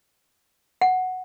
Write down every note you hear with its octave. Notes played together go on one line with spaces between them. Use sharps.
F#5